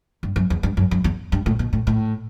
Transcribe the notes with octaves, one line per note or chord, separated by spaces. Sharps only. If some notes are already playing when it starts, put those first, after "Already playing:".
G2
F#2
E2
G2
F#2
F#2
E2
G2
A2
B2
A2
A2